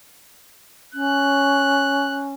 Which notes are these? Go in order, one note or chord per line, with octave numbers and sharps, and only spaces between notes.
C#4 F#6